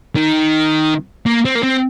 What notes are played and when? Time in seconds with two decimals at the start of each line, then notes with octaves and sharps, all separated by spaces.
0.15 D#3
1.26 A#3
1.45 C4
1.55 A#3
1.63 C4